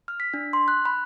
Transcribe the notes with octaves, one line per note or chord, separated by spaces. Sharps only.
F6
B6
D4
C6
F#6
B5